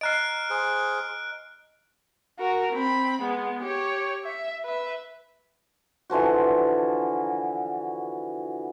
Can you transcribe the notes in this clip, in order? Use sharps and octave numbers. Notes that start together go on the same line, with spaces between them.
D#5 A#5 F6 F#6 C7 D7
G#4 C5
F#4 A#4
C4 B5
G#3 B3
G4 C#5
E5
B4 E5
D3 E3 F3 F#4